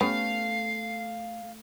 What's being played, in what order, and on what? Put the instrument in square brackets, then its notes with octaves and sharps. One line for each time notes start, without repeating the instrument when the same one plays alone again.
[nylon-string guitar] A3 [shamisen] B3 C#4 G4 [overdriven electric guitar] F5 [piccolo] C7